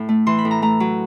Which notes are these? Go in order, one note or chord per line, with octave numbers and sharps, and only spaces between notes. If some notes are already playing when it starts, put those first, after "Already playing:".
Already playing: A2
A3
E3 C6
B5
A2
A#5
A3 A#5
F#3